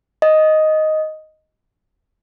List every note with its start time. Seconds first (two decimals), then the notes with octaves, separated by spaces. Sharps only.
0.22 D#5